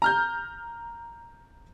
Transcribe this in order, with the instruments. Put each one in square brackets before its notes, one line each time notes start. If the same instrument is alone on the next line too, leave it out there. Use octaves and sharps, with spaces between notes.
[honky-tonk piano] A#5 F6 G6